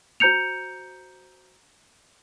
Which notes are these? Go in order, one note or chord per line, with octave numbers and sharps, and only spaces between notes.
F#4 C5 A#5 G6 C#7 F7